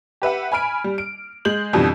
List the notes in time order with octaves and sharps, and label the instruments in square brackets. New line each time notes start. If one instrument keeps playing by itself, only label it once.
[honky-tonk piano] G4 B4 E5 F#5
G#5 B5 F6 D7
G3
D7
G#3 G6 F#7
F2 B2 D3 E3 G3